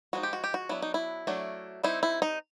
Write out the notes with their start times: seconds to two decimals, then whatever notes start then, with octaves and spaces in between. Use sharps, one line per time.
0.13 F3 G#3 B3 D#4 F#4
0.23 G4
0.33 F#4
0.44 G4
0.54 F#4
0.69 F#3 B3 D4 E4
0.82 D#4
0.94 E4
1.27 F#3 A3 D4
1.83 G3 C4 D#4 E4
2.03 E4
2.22 D#4